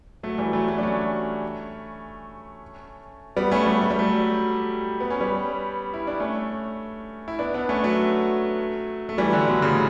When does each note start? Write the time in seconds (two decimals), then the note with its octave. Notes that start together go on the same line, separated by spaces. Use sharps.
0.23 F#3 A3
0.38 E3 G3
0.53 F#3 A3
0.68 F#3 A3
0.78 D4
0.83 A3 C#4
3.37 G3 B3
3.51 A3 C#4
3.66 G3 B3
3.81 A3
3.90 G3
3.99 F#3 A3
5.00 B3
5.10 C#4
5.20 G3 B3
5.94 E4
6.07 D4
6.20 A3 C#4
7.28 E4
7.39 B3 D4
7.54 B3 D4
7.69 A3 C#4
7.84 F#3 A3
9.09 A3
9.18 E3 G3
9.33 D3 F#3
9.48 B2 D3
9.62 A2 C#3